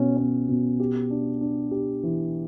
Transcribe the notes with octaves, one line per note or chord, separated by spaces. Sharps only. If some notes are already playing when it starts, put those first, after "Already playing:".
Already playing: B2 C#4
C#4
B2
G4
D4
D4
G4
E3